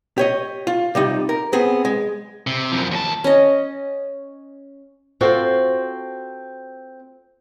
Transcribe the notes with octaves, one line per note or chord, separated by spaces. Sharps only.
G4 C#5 D#5
F4
C3 G3 D#4
A#4
B3 C4 G#4
G#3
C3
F#2 F3
D#2 A5
C#4 D#5
C4 F4 F#4 A4 C5